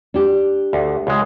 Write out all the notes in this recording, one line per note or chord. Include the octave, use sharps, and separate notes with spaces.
D4 G4
D2
C#2 G#3